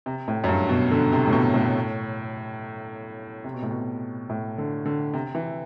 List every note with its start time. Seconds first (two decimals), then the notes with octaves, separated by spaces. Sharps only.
0.06 C3
0.28 A2
0.44 F#2
0.49 G2
0.69 B2
0.91 D3
1.12 C3
1.27 A2
1.33 B2
1.54 A2
3.44 C3
3.54 B2
3.62 A2
3.71 B2
4.30 A2
4.58 D3
4.86 D3
5.14 C3
5.35 E3